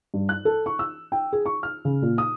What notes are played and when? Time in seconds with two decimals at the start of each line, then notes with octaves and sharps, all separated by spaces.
0.14 G2
0.29 F#6
0.45 A4
0.66 C#6
0.79 E6
1.12 G5
1.33 G#4
1.46 C#6
1.63 F6
1.85 C#3
2.02 A#2
2.18 D#6